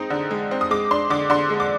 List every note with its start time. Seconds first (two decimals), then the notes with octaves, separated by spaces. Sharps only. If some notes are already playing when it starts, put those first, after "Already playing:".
Already playing: G#3 C4 D#4
0.10 D3
0.31 G#3
0.51 C4
0.61 D#6
0.71 G#3 D6
0.91 D4 C6
1.10 D3 D6
1.30 D3 C6
1.50 G#3
1.60 D6